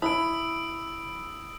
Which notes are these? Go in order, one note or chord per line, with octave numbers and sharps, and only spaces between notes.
E4 B5 D#6 E6 D7